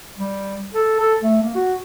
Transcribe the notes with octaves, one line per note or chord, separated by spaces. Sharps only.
G3
A4
A4
A3
A#3
F#4